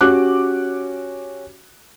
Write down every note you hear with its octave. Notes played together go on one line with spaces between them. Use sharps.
C#4 F#4 G4 D6 F#6